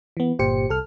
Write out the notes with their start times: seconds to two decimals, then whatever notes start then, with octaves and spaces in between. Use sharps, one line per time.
0.17 E3 B3
0.39 G1 A#2 G4 C5 C#7
0.69 C2 A4 F6